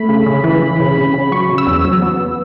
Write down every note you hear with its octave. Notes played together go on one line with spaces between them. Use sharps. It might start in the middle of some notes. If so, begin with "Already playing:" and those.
Already playing: A3 B5
C#3
C#3
E3
E3
C#3
C#3
C#3
F#3 C#6
C#3
E6
E2
F#3 E6
B3